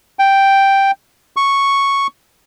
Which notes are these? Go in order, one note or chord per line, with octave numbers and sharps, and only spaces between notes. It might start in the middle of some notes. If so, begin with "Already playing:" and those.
G5
C#6